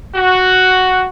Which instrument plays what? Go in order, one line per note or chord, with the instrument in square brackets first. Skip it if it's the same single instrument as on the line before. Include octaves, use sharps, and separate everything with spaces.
[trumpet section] F#4